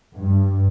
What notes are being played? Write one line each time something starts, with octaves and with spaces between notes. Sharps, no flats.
G2